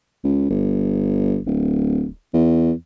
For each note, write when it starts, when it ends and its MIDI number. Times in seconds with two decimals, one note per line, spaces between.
0.24 0.46 37
0.50 1.40 31
1.46 2.08 26
2.34 2.72 40